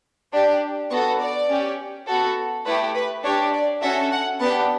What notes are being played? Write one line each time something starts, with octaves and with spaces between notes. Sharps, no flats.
D4 G4
B3 F#4 A4 C#6
D5
C#4 G4
B3 F#4 A4
A3 E4 G4 B4
B4
D4 G4 C#5
D5
C#4 F#4 A4 E5
F#5
B3 D4 G4 A5